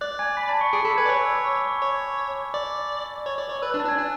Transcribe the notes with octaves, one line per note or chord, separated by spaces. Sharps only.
D5 F#6
G#5 G#6
B5 B6
A5 A6
C#6 C#7
G#4 D6 D7
A4 B5 B6
B4 G#5 G#6
D5
C#5 F#6
E6
D6
C#6
D6
C#6
C#5
D6
D5
C#5
D5
C#5
B4 E6
F#6
D4
A5 A6
D4 G#5 G#6
D4 F#6